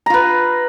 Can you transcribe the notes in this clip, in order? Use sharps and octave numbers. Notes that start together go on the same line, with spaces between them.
F4 B4 A#5